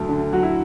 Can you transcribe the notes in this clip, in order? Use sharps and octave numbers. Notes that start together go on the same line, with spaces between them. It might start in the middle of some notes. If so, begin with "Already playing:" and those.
Already playing: D2 F#3 A3
D3
F#3 F#4
E4